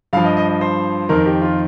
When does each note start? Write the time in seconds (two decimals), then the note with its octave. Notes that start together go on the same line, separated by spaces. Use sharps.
0.13 G2 F3 F5
0.25 D#5
0.37 D#5
0.49 D#5
0.61 C5
1.09 F2 D#3 A#4
1.26 G4
1.41 F4